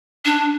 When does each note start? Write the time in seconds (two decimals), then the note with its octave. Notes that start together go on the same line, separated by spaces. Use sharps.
0.25 D4